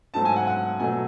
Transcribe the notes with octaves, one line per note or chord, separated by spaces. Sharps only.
G#2 F#3 A3 A5
G#5
F#5
F#5
B2 F#3 A3 G#5